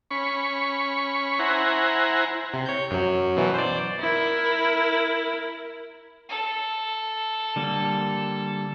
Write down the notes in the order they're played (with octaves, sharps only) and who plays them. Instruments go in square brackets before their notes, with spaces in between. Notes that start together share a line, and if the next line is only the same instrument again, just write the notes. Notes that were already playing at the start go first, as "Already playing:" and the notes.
[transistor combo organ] C#4 B5 C#6
E4 C5 F#5 G#5 A#5
[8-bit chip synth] C3
C#5 G6
F#2 F#3
B2 E3 F#3
C5 D5
[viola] E4 A#4
[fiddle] A4
[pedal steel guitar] D3 G3 A#3